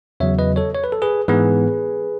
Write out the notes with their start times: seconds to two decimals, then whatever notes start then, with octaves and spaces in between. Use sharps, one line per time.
0.20 E2 C#3 F#3 C#5 E5
0.39 B4 D#5
0.56 A4 C#5
0.75 C#5
0.84 B4
0.92 A4
1.02 G#4 B4
1.28 G#2 E3 B3 G#4 B4